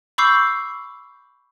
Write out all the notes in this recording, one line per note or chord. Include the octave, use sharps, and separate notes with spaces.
B5 C#6 D6 E6 G6 C7